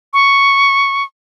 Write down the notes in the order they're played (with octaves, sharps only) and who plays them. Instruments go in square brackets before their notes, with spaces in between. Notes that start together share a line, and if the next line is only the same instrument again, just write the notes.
[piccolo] C#6